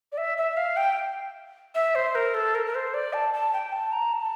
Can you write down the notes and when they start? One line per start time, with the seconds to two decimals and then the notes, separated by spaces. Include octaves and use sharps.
0.12 D5
0.18 E5
0.38 E5
0.57 F5
0.77 G5
1.75 E5
1.95 C5
2.15 A#4
2.34 A4
2.55 A#4
2.66 A#4
2.75 C5
2.94 D5
3.13 A5
3.33 A5
3.53 G5
3.72 A5
3.92 A#5
4.13 A5